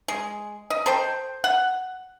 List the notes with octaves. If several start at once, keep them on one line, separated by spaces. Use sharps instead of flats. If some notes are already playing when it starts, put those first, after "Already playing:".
G#3
D#5
A4 C5 G5
F#5